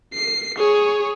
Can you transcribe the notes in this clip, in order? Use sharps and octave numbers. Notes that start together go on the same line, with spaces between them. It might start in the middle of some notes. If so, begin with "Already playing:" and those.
C7
G#4 C#5